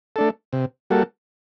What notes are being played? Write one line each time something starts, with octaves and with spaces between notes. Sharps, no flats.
A3 D4 A4
C3
G3 A#3 F#4 A4